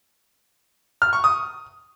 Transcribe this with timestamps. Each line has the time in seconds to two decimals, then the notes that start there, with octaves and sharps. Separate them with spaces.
1.02 F6
1.13 C#6
1.24 D#6